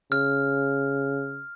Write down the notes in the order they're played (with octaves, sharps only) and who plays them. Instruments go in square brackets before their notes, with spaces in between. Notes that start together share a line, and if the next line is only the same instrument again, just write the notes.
[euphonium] C#3 [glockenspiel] F6